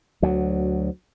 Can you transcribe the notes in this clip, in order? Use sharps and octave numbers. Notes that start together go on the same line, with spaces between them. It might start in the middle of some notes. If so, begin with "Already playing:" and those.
D2 F#3